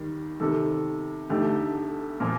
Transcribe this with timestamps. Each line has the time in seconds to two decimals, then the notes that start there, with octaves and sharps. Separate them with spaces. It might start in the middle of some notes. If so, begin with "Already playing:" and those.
Already playing: D#2 D#3 G3
0.40 C3 D#3 G3 A4
1.30 D2 D3 A3 D#4 G4
1.75 A4
2.20 A#2 F3 A#3 A#4